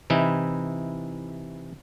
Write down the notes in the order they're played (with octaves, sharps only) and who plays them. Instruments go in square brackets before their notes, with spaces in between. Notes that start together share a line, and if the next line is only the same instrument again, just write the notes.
[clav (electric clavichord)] C3 E3 D#4 E4